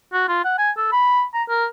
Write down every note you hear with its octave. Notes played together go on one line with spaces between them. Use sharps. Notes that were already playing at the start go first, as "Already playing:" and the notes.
F#4
F4
F#5
G#5
A4
B5
A#5
A#4